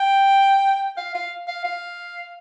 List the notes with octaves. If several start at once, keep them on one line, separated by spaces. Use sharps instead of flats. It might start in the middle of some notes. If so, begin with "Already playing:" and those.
Already playing: G5
F5
F5
F5
F5